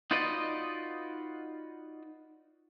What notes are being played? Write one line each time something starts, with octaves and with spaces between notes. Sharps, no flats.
D#4 F4 F#4 B4 D5 D#5